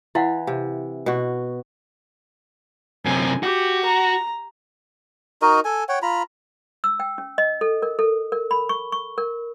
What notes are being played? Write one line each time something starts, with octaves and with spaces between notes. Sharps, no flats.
E3 E4 F5 F#5
C3 F5
B2 F#4
F#2 C3 G#5
F#4 G4
A#5
D#4 F#4 A#4 D#5
A4 G#5
C#5 F#5 G5
F4 A#5 B5
E6
G5
C#4
D#5
A4
A#4
A4
A#4
B5
C#6
C#6
A#4